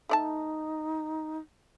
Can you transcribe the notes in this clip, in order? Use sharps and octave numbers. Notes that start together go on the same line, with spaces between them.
A3 D#4 D5 A5